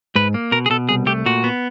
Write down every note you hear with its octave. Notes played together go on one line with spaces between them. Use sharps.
G#2 B4
A#3
B2 A#4
G#4
B2 A4
C2 G#4
A3 G4
A#2 F#4
B3